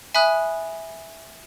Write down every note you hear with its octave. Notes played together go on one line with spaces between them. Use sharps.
E5 G#5 B5 D#6 F#6